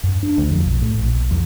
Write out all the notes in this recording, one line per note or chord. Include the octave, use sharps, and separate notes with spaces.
F#2
D4
D2
F2
B1
A2
A#1
B1
E2